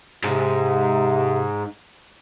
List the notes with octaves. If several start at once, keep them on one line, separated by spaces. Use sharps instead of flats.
G#2 C3